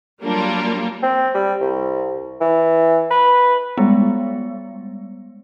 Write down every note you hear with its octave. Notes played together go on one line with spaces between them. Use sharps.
F#3 G3 A#3 D4 F4
C4
G3
C2
E3
B4
G3 G#3 B3